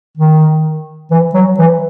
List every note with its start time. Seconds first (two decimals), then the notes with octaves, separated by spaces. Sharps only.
0.17 D#3
1.11 E3
1.34 F#3
1.58 E3